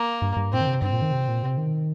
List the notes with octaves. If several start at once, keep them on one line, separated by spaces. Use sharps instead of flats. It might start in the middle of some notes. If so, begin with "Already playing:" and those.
Already playing: A#3
G2
G2
A#2 C4
D#3
C3
G2 C4
A#2
D#3
C3
A#2
C3
D#3